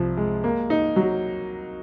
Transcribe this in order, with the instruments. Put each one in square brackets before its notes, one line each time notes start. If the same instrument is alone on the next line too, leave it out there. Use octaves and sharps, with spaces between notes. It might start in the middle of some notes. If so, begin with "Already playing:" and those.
Already playing: [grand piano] C2 F3
G#3
A#3
D#4
F#3